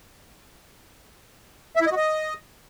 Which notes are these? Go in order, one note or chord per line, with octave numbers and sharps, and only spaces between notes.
E5
E4
D#5
F#4
D#5